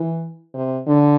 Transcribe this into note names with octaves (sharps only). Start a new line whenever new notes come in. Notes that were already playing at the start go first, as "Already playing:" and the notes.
Already playing: E3
C3
D3